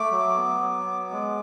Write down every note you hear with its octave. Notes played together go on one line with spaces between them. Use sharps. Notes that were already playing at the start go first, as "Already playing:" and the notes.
Already playing: A3 D6
F#3
B3
F#3
B3
G#3